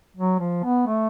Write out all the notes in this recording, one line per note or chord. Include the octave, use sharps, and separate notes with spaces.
F#3
F3
B3
A3